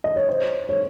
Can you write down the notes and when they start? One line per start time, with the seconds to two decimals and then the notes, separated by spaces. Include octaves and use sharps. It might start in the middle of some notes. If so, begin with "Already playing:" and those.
0.04 D#5
0.16 C#5
0.29 C5
0.69 C#5